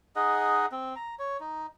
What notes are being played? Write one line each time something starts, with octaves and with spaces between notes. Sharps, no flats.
D#4 G#4 D#5 F#5
C4
A#5
C#5
D#4